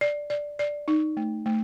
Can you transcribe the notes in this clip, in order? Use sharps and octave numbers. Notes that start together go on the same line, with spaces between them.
D5
D5
D5
D#4
A3
A3